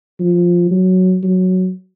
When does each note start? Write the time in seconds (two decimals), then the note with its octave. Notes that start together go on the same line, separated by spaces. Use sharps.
0.20 F3
0.71 F#3
1.23 F#3